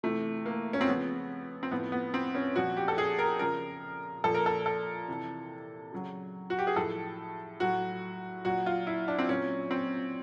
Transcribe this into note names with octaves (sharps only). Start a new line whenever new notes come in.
C3 E3 A3
A#3
C#4
C4
C#3 F3 B3
C4
A2 F3 B3
B3
C4
C#4
A#2 F3 F#4
G4
A4
G#4
A#4
C#3 F3 A#4
A#2 F3 A4
A#4
A4
A4
C3 E3
C#3 F#3
F#4
G4
G#4
A2 F3 A4
A2 F#3 F#4
A#2 F#3 F#4
F4
E4
D4
C4
A#2 F#3 C#4
C4